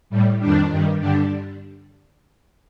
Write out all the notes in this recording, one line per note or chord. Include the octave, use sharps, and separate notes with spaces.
A2 G3
F2 D#3 G3 D4
G2 D#3 G3
G2 D3 G3 D4